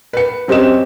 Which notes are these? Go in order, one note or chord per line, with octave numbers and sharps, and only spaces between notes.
B4 C#7
F#2 C4 G4 D#5 E7